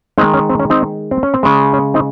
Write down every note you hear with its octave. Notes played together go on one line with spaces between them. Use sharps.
D#3 G#3 C4 D#4
C#4
C4
C#4
C4 D#4
C4
C#4
C4
C#3 G#3
C#4
C4 D#4